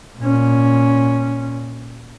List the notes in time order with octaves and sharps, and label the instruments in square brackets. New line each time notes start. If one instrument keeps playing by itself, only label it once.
[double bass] A#2 C#4